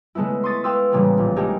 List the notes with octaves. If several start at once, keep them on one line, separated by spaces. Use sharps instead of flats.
C#3 G#3 A3 B3 E4
C6 C#6 D#6 A6 B6
B4 F5 G5 C6 D#6 E6
A2 C#3 E3 G3 A#3 B3
A#1
G#3 A3 D#4 G4 G#4 A#4